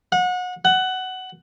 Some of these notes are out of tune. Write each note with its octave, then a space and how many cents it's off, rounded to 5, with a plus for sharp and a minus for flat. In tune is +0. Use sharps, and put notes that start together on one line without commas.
F#5 -30
F#5 +15